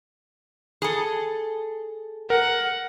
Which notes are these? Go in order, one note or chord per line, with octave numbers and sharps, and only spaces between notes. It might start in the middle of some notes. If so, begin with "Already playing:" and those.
G#4 A4
A#4 F#5